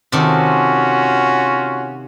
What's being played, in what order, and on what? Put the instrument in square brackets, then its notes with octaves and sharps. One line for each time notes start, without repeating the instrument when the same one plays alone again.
[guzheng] C3 D#3 A4 [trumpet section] C#4 F4 F#4